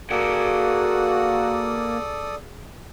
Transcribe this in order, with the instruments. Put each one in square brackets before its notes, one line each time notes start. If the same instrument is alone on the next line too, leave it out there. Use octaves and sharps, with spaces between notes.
[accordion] A#3 [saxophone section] F#4 [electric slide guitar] G#4 F#5 G5 [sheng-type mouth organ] A4 D5 D#6